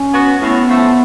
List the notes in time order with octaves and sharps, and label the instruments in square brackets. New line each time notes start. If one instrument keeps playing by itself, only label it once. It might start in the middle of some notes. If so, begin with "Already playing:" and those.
Already playing: [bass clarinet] C#4
[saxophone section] B3 F#4
[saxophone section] A2 [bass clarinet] B3
[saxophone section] F3 A3